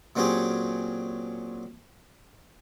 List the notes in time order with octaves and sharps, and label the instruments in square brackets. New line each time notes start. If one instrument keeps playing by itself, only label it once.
[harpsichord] A#2 F#3 C4 C#4 G4 G#4